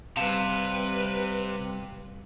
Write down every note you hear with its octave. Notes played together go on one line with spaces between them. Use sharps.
C3 G3 B4 F5 A5 E7